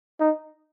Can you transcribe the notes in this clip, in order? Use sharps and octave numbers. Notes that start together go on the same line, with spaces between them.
D#4